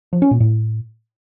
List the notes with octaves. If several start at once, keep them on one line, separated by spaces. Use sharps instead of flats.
F3
C#4
A#2
A2